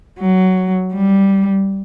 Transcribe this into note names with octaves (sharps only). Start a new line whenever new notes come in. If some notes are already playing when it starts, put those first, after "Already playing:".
F#3
G3